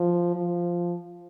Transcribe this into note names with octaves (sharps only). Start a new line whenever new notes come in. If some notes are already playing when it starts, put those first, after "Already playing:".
Already playing: F3
F3